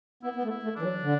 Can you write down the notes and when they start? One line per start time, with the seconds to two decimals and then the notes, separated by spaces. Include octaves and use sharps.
0.23 B3 E4
0.35 B3
0.43 A3
0.49 E4
0.63 A3
0.76 E3 D4
0.82 F#3
1.02 D3